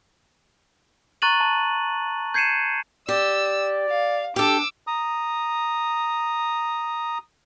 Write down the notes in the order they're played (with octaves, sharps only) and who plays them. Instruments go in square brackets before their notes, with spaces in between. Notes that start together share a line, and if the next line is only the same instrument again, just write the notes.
[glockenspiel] A#5 C#6 F#6 A6 D#7 F#7
A5
G6 G#6 C7 C#7 D#7 E7
[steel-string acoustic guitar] G4 [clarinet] D5 [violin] E6
[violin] F5
[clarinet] D4 [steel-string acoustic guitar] G4 A4 [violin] D6 E6
[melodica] A#5 D#6